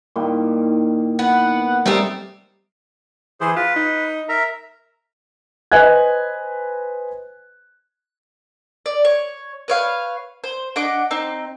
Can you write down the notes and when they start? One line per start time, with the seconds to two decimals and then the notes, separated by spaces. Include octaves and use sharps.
0.16 A#2 D#3 G3 D#4 E4
1.19 B3 F#5
1.86 G3 A3 C4 G4 A#4 D#5
3.41 E3 G#4 C5
3.56 F4 B4
3.76 D#4
4.29 A#4 E5 A#5
5.72 B4 C5 D#5 G#5 F#6 G#6
8.86 D5
9.05 C#5
9.68 B4 C#5 F5
10.44 C5
10.76 D4 D#5 F#5 D6
11.11 C4 D#4